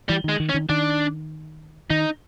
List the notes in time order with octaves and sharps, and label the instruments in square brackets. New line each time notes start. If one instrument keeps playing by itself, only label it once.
[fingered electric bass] E3 [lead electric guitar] G3
[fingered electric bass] D#3 [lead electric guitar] G#3
[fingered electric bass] D#3
[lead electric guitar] C#4
[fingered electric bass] D#3
[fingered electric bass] D#3 [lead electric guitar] D4
[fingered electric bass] D#3 [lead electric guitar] D#4